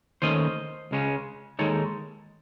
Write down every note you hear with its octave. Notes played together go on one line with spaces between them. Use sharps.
D#2 D#3 A3 C#4 C5 D#5
C#2 C#3 G#3 C#4
D#2 D#3 G#3 D#4 A4 C#5